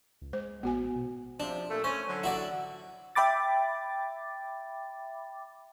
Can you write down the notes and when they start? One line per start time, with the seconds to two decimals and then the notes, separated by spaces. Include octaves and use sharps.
0.22 C#2
0.33 G#3 C5
0.63 A1 B3 F#4 G#5
0.96 B2
1.40 C3 F3 D4
1.69 A#2 A3
1.84 A3 C#4 C5
2.08 D3 F#3
2.24 E4 F#4 D5
3.15 E5 G5 B5 D6 A6